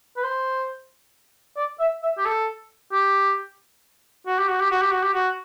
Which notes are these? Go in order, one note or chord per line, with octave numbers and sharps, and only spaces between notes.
B4
C5
D5
E5
E5
G4
A4
G4
F#4
G4
F#4
G4
F#4
G4
F#4
G4
F#4